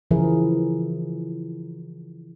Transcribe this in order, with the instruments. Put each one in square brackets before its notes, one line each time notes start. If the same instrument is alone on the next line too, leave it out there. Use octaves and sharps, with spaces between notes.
[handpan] C#3 E3 F3 E4 G#4 A#4